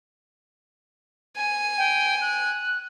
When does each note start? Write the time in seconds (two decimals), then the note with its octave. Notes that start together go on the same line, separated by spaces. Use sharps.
1.37 G#5
1.78 G5
2.21 F#6